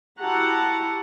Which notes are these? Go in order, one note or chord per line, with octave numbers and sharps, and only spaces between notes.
E4 F#4 G4 F#5 A5 A#5